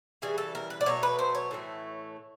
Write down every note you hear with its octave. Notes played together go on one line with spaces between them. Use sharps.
C#3 E3 G3 G#4
A4
A#4
B4
D5
B2 F#3 A3 C#5
B4
C5
C#5
A2 E3 A3